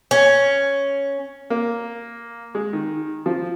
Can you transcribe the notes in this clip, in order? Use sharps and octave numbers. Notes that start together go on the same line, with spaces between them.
C#4
A#3
G#3
D#3
F3